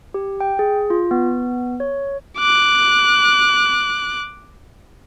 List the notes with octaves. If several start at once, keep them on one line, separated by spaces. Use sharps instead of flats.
G4
G5
G#4
F4
B3
C#5
D6 F#6